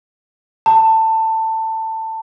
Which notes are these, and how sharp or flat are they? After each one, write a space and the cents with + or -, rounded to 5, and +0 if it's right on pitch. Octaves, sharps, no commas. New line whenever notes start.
A5 +20